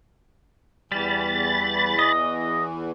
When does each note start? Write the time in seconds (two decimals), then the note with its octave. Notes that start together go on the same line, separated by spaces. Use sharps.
0.92 E2 E3 G3 B5 A6
1.99 D#5